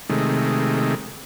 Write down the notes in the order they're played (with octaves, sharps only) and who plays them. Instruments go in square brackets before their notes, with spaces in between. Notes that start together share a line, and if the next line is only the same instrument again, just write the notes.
[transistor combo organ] C3 D#3 G#3 A3